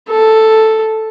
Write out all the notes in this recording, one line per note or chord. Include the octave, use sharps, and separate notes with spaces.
A4